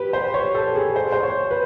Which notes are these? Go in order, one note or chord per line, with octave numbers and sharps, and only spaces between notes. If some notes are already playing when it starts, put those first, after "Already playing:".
Already playing: G4 B4
C5
C#5
A4
G#4
C5
C5
C#5
B4